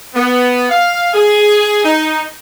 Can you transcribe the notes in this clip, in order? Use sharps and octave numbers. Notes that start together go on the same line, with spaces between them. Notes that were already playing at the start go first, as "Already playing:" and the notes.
B3
F5
G#4
D#4